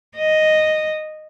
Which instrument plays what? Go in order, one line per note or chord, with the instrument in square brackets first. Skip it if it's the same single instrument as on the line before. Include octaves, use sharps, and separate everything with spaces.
[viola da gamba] D#5